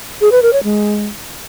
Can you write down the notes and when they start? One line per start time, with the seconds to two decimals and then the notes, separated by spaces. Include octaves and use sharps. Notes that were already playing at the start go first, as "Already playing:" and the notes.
0.21 G#4
0.32 B4
0.42 A#4
0.53 C#5
0.64 G#3